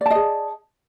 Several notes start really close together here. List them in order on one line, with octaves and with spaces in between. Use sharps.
D5 A5 D#5 G#4